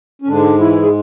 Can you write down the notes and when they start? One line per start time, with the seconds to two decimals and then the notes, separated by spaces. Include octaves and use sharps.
0.22 C#4
0.27 G#2 D3 G#3 D4
0.58 E3 E4
0.82 G#4